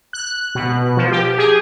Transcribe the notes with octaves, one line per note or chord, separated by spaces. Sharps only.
F#6
B2
F3
G4
G#4